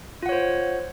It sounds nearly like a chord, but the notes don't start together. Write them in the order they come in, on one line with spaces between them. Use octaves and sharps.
F4 F#5 C#5 C5